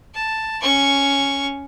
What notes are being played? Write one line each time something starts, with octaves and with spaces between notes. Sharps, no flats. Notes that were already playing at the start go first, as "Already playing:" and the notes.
A5
C#4 C#6